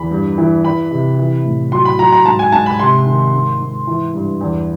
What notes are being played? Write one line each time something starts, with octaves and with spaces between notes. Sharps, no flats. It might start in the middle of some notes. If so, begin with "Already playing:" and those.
Already playing: E2 B5
G2
E3
E3 B5
C3
E3
A2
F#3 C6
B5
F#3 A#5
A#5
G#2 A5
G#5
G#2 A5
B5
C3 C6
D#3
G#2
G#2
E3
G2
E2